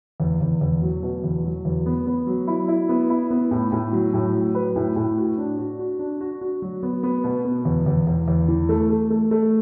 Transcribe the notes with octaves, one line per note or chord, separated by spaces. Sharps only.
E2
E2
E2
F#3
B2
E2
F#3
E2
B3
B3
F#3
E4
E4
B3
E4
B3
A2
A2
F#3
A2
F#3
B4
A2
A2
F#4
D4
F#4
F#4
D4
F#4
F#4
F#3
B3
B3
B2
B3
E2
E2
E2
E2
E3
A3
A3
A3
A3